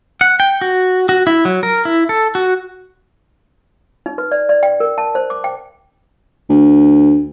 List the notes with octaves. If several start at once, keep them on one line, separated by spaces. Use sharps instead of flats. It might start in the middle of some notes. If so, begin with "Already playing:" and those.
F#5
G5
F#4
F#4
E4
F#3
A#4
E4
A4
F#4
D#4
B4
D5
D5
G5
A#4
A5
C5
D6
G5
D2